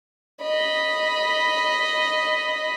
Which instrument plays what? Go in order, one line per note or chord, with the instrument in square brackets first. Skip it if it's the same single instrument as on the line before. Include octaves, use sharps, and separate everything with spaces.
[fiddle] D#5 B5